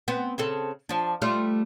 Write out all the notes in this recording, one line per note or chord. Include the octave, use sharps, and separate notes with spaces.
B3 C4
C#3 C4 A4
F3 D4
G3 A3 F4